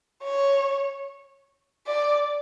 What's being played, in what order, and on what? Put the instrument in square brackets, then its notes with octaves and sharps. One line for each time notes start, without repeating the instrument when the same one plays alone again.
[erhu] C#5
D5